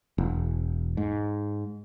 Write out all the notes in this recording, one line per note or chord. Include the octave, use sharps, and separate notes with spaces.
E1
G#2